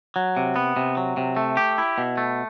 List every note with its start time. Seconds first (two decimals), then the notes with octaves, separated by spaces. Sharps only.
0.16 F#3
0.37 C3
0.56 B3
0.76 C3
0.97 F#3
1.17 C3
1.37 A3
1.57 G4
1.78 E4
1.98 B2
2.17 A3